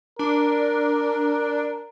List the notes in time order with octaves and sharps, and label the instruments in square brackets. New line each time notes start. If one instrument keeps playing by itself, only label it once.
[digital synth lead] D4 [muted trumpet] A#4